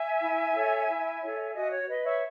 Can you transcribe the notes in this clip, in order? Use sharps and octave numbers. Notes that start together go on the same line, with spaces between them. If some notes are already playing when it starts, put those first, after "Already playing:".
Already playing: E5 G#5
E4
A4 C#5
E4
A4 C#5
F#4 D#5
C#5
B4 D#5
C#5 E5